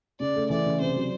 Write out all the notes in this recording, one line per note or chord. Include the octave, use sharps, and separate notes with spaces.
C#3 D5
A3
E3 D5
C#3
C3 C5
F#3